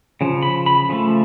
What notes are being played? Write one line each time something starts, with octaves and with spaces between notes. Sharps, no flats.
C#3 F3
B5
B5
C#3 F3 A3